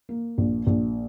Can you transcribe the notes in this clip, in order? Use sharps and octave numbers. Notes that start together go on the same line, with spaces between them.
A#3
A#1
A#1